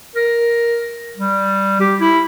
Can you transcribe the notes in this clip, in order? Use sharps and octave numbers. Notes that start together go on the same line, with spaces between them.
A#4
G3
G4
E4